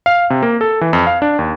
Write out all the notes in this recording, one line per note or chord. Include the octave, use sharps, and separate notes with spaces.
F5
C3
A#3
A4
E3
F2
F5
D4
D#2